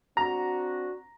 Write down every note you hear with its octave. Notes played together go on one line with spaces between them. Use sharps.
C4 D4 F#4 A#5